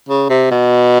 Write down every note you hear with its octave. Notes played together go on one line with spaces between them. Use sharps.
C#3
C3
B2